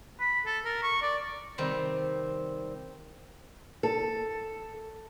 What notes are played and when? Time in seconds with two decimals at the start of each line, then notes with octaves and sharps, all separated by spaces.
0.20 B5
0.46 A4
0.65 A#4
0.83 C#6
1.02 D5
1.58 C3 D#3 G3 C4
3.83 A4